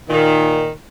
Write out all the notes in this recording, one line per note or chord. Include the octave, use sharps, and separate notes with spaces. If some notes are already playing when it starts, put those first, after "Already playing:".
A#2 D#3